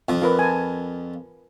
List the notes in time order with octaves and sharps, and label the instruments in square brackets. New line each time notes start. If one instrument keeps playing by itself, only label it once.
[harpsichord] F2 F3
[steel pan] F4 A#4 B4
G#5 A5